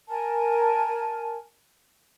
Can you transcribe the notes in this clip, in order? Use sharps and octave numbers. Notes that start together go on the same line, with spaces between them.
A#4 G#5 A5